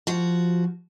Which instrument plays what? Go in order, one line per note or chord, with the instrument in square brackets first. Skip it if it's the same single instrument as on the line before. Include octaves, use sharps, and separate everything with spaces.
[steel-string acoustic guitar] F3 F#4